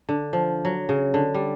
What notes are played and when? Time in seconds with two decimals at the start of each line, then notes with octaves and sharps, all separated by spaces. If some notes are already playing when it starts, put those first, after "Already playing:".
0.09 D3
0.33 F3
0.65 F#3
0.89 C#3
1.14 D3
1.34 G3